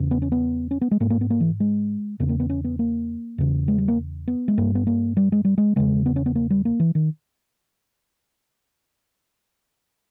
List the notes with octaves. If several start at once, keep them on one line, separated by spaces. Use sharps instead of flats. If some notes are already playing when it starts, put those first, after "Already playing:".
Already playing: E2 C#3
B3
C#4
B3
C#4
B3
G#3
G#2 A#3
A#3
B3
A#3
E3
G#3
E2 C#3 B3
A#3
B3
C#4
B3
A#3
E2 C#3
G#3
G3
A#3
B3
G#3
G2 A#3
B3
A#3
G3
G#3
G3
G#3
E2 C#3 G#3
B3
C#4
B3
A#3
G3
A#3
E3
D#3